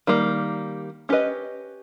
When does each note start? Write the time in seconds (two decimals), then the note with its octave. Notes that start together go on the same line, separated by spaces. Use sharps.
0.07 D#3 G3 A#3
1.09 C#4 G4 B4 D#5